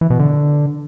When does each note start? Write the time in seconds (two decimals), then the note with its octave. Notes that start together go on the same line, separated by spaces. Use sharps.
0.01 E3
0.10 B2
0.19 D3